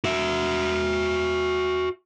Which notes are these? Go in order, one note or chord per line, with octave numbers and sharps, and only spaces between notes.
F#4 E5